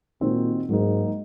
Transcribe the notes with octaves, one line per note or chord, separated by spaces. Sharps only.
A#2 D#3 G#3 C4 F#4 C5
G#2 F#3 A#3 D#4